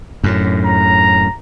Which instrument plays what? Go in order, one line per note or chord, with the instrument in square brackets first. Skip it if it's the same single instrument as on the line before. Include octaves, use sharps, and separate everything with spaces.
[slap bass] F#2 A2
[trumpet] A#5